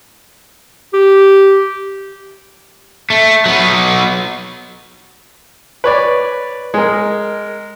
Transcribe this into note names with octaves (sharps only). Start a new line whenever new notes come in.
G4
A3
F#3 B3
B4 C#5 D5
G#3 A#4